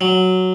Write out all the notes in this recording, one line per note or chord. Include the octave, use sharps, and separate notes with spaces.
F#3